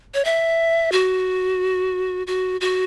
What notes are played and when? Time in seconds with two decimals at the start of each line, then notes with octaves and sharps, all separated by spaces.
0.14 C#5
0.25 E5
0.92 F#4
2.27 F#4
2.61 F#4